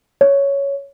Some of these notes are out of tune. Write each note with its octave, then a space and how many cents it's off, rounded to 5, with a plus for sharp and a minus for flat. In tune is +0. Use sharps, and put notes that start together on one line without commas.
C#5 +5